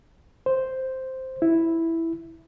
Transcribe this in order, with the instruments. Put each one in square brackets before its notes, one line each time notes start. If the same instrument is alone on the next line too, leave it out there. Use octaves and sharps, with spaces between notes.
[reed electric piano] C5
E4